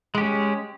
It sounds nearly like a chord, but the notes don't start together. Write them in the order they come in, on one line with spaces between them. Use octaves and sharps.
G#3 G4 C#4